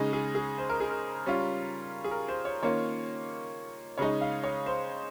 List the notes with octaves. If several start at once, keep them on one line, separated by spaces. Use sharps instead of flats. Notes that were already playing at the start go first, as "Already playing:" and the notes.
Already playing: C#3 G#3 D#4 G#4
G#4
G#4
C5
A#4
G#4
A#4
G3 C#4 F4
G#4
A#4
C5
C#5
D#3 A#3 C#4 F4 C#5
C#3 G#3 D#4 C#5
F5
C#5
C5